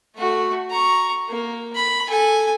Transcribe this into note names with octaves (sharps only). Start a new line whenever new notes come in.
A3 F#4
A#5 C#6
A#3
B5
A4 G#5